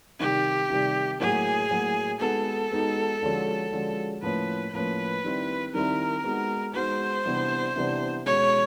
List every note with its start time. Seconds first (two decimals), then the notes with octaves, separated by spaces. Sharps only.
0.20 C3 D#3 G3 G4
0.70 C3 D#3 G3
1.20 A2 F#3 A#3 G#4
1.71 A2 F#3 A#3
2.20 G#3 B3 D#4 F#4 A4
2.71 G#3 B3 D#4 F#4
3.22 D3 F3 G#3 C#4 F#4
3.72 D3 F3 G#3 C#4 F#4
4.22 A2 F3 A#3 C#4 B4
4.73 A2 F3 A#3 C#4 B4
5.24 D#3 G3 C4 E4
5.74 D#3 G3 C4 E4 A#4
6.24 G#3 B3 D#4 F#4
6.75 G#3 B3 D#4 F#4 C5
7.25 C3 E3 G3 B3 D4
7.76 C3 E3 G3 B3 D4
8.26 B2 G#3 C#4 F#4 C#5